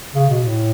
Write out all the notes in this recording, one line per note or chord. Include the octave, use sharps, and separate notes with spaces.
C#3
B2
A2